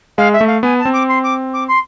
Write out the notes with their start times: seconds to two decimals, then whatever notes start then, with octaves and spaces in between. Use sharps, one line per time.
0.18 G#3 F5
0.33 E5
0.41 A3
0.47 F5
0.63 B3 G#5
0.78 A5
0.85 C4
0.93 D6
1.08 C6
1.23 D6
1.53 D6
1.68 C6